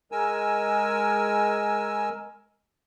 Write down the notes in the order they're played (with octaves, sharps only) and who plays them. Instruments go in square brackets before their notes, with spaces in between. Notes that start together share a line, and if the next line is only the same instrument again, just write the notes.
[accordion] G#3 A#4 G#5 E6